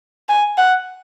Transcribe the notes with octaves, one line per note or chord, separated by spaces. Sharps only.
G#5
F#5